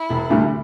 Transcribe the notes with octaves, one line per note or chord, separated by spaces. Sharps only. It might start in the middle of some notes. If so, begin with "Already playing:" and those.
Already playing: E4
E1
D2 D3 G3